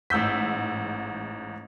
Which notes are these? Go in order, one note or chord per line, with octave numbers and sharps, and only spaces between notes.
A1 G#2 E6 G6 B6